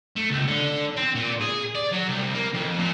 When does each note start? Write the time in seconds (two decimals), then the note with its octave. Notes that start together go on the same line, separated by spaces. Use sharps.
0.16 A3
0.30 C#2
0.47 D3
0.97 C4
1.15 A#2
1.41 G#4
1.75 D5
1.92 F#3
2.09 C2
2.35 A#3
2.54 F2
2.78 A#2